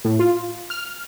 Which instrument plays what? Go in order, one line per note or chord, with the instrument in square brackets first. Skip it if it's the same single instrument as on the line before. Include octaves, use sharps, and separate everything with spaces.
[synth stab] A2
F4
F6